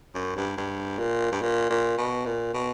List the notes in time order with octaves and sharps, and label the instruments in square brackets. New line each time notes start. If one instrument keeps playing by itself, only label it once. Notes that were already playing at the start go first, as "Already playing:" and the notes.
[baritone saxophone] F#2
G2
G2
A#2
G2
A#2
A#2
B2
A#2
B2